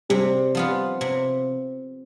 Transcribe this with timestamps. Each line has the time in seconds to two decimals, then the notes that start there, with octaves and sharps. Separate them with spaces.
0.10 C3 G3
0.55 F3 B3 F4
1.01 C3